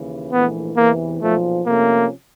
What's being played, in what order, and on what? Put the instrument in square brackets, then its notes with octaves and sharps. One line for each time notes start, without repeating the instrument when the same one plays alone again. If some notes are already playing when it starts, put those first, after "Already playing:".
Already playing: [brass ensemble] D#2 C#3 E3
[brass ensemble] A#1 G#2 E3 A3 [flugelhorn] B3
[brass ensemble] E2 C3 E3 [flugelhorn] A#3
[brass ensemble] B1 A#2 F3 [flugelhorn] A3
[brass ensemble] C3 F3 A3 C#4 [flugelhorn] A#3